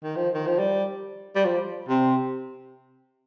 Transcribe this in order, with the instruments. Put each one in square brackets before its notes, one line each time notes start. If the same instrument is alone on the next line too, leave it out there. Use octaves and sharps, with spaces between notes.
[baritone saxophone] D#3
F3
D#3
F3
G3
G3
F3
C3